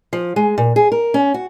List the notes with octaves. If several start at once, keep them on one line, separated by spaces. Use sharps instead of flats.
F3
G#3
A#2
G#4
A#4
C#4
F#4